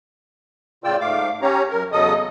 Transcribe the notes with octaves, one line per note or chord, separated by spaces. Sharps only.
A2 C#3 F4 D5 G5 E6
G#2 A3 F5 D6
C#4 G4 C#5 A#5
F#2 A#4
E2 C#3 F#3 A4 D#5 D#6